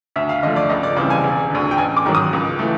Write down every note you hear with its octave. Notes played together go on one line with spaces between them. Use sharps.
D2 E5
F5
D3 F3 A3 D#5
D5
C#2 D#5
D5
C#3 E3 G3 C4 D5
G#5
E1
D2 D3
G5
A1 G#5
D6
G#2 D#3 F#3
D#6
C#2
E3 A3